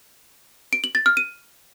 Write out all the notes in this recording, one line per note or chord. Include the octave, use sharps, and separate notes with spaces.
D7
F#7
A6
F6
D#7